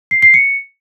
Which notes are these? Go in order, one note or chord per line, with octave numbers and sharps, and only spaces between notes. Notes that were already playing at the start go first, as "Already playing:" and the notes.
C7
C7
C#7